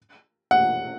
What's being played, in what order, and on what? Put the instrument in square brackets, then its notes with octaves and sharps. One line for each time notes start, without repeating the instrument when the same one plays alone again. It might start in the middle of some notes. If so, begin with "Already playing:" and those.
[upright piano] F#5